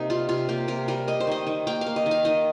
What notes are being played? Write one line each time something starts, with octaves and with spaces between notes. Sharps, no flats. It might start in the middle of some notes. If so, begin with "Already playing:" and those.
Already playing: C3 A#3 D#4
G3 F4
C3 F4
A#3 G4
C3 A#4
G3 A#4
A#3 D#5
C5
D#3 D#5
D#3
A#3 G5
F5
A#3
D#5
D#3
F5
D#3 D#5